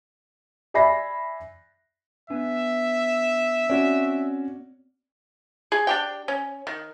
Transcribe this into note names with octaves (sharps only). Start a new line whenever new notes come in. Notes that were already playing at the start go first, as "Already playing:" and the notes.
D5 E5 G#5 B5 A#6 C7
B3 D4 E5 G#5
C4 C#4 F#4 D5
G#4
D4 G4 G5
C#4
D#3